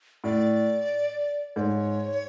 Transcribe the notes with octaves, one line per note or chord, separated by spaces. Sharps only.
A2 D5
G#2 C#5 D5